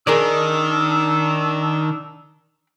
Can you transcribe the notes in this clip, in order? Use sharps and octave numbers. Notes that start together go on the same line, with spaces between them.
D#3 D4 G#4 A#4 D5 E6